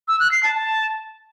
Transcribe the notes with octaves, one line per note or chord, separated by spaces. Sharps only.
E6
F#6
C7
A5
A5